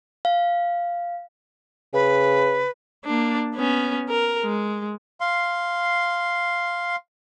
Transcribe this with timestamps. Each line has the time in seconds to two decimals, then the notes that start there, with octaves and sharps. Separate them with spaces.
0.25 F5
1.93 C#3 B4
3.05 A#3 D4
3.55 B3 C#4
4.09 A#4
4.43 G#3
5.21 F5 C6